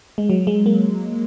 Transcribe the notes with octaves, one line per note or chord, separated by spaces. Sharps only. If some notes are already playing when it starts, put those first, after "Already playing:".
G#3
F#3
G#3
A#3